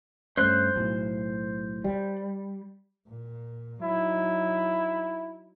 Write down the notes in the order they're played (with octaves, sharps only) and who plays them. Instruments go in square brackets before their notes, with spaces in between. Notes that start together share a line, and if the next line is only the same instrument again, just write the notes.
[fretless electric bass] G2 A3 C#4 [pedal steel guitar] C5 F#6
[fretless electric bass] B1 A2
G3
[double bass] A#2
[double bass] F#3 D#4 [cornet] E4